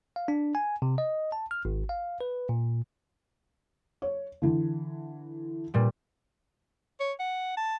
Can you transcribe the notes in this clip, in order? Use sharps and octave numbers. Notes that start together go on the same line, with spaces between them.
F5
D4
G#5
C3
D#5
A5
F6
G#1
F5
B4
A#2
C#5
D3 E3
A#2 G3
C#5
F#5
A5